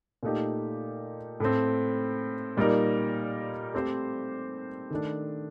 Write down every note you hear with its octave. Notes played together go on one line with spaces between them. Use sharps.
A#2 A3 D#4 G4
A2 A3 C4
A#2 G3 A#3 D#4 A#4
A3 C4 G4 C5
D#3 A3 D4